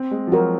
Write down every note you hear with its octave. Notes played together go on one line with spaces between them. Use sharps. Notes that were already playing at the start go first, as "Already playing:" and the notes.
Already playing: C4
G#3
F3
F#3 F#4 A#4